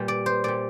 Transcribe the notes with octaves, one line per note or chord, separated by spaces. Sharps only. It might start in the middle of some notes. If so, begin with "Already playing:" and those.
Already playing: A#2 G3
D5
C5
A#2 G3 D5